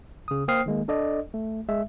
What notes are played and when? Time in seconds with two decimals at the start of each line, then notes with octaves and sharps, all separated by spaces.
0.28 C#3 D#6
0.48 A#3 C5 G5 D#6 F6 C7
0.66 D#3 G#3 A#3
0.88 D4 A4 D5 D#5
1.34 A3
1.69 G#3 E5